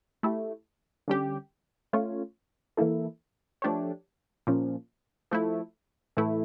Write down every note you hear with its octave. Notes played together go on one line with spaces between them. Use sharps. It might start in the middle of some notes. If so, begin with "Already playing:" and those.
A3 E4 G4
D3 G3 C#4 G4
A3 C#4 F4 C#5
E3 A#3 E4 A4
F3 A3 D4 G4 C#5
A#2 F3 C#4
F3 A3 E4
A2 E3 A3 E4